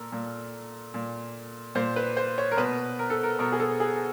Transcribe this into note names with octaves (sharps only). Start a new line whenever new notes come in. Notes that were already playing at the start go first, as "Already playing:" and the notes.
Already playing: A#2 A4 A#4
A#2
A#2
A#2 C5
B4
C5
C#5
A#4
B2 B4
A#4
A4
A#4
B2 A#4
G#4
A4
G#4